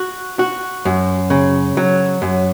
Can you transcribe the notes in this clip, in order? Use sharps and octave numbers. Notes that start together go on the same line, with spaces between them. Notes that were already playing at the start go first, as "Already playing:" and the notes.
Already playing: F#4
F#4
F#2
C#3
F#3
F#2